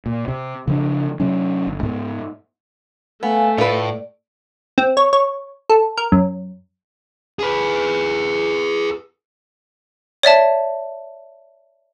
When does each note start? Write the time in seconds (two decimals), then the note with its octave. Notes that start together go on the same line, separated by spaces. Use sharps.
0.06 A#2
0.28 C3
0.67 C#3 F3 D4
1.20 C3 F#3 C#4
1.67 G1
1.83 G#2 B3
3.23 A3 B3 F5 G#5
3.58 A2 F4 B4 D5
4.78 C4
4.97 C#5
5.13 C#5
5.70 A4
5.97 A#4
6.12 F#2
7.39 G#4 B4
10.23 C#5 D5 E5 A5